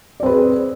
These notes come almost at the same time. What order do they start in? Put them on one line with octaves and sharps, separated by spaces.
D5 C4 B4 G#4